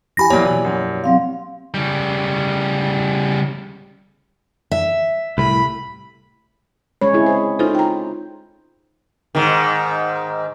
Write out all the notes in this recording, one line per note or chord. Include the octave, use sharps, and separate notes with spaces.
F3 E4 G4 G#5 B5 A#6
E2 A#2 F#3 A#3 C#5 D5
B2 E3
F#2
F#3 C4 F5
C#3 G3
E5
C2 A2 B5
G#3 C#4 C#5 B5
C4 E4 G#4
C5
D#4 F4 A4 C5
G5 A#5
G#2 D#3